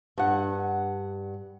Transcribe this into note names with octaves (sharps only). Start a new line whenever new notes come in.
G2 F#5